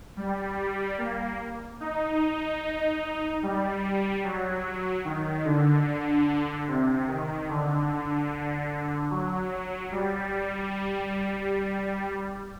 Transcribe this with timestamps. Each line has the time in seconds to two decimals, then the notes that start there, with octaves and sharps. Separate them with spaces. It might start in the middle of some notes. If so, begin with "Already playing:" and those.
0.17 G3
0.57 G3
0.98 A#3
1.80 D#4
3.43 G3
4.24 F#3
5.05 D#3
5.45 D3
6.67 C3
7.08 D#3
7.49 D3
9.11 F#3
9.92 G3